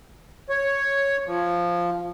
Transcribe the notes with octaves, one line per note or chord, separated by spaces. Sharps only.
C#5
F3